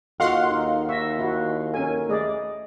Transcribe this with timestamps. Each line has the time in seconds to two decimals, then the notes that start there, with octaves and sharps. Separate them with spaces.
0.20 D#2 F4 F#4 A4 D#5 F5 F#5 C6
0.51 D#4
0.89 E5 C#6 A#6
1.19 E4 F#4
1.74 C#4 A4 A#4 G#5
2.09 A3 G#4 D5 D#5 D#6